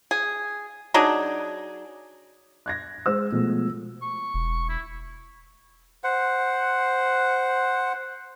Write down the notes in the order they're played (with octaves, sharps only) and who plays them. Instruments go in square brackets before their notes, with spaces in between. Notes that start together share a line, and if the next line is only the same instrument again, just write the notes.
[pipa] G#4
F#3 D4 D#4 G#4
[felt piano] F#6 G#6 A#6
G#3 C5 E6
B2 F3 G#3 A3
[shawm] C#6
[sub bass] E1
[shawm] E4
[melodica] C5 F#5